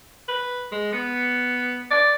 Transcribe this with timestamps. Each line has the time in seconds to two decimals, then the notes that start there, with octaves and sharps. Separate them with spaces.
0.28 B4
0.72 G#3
0.92 B3
1.91 D5